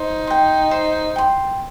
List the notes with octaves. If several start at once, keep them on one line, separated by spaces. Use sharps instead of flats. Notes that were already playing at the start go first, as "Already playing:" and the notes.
Already playing: D#4 C5
G5 C6
C5
G5 C6